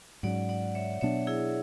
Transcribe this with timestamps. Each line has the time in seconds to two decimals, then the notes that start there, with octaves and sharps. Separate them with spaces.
0.23 G#2 F#3 C#4 D5 F#5
0.49 D5 F#5
0.75 C#5 E5
1.01 B2 F#3 B3 D4 C#5 E5
1.27 E4 G#4